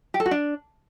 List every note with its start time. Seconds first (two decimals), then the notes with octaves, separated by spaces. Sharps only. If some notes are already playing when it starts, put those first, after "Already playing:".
0.14 G4
0.20 A4
0.26 F#4
0.31 D4